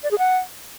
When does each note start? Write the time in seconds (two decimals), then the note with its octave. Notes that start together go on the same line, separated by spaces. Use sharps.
0.03 D5
0.11 G#4
0.18 F#5